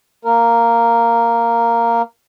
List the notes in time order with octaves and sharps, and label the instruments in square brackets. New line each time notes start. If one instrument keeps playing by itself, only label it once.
[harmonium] A#3 A#4